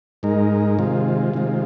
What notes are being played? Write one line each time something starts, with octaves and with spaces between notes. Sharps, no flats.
G#2 G#3 D#4 A#4
C3 D#3 G#3 F4
C3 D#3 G#3 F4